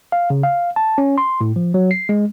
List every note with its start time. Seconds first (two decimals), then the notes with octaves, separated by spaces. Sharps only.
0.12 F5
0.30 C#3
0.43 F5
0.76 A5
0.98 C#4
1.18 C6
1.41 A2
1.56 F3
1.74 F#3
1.91 C7
2.09 G#3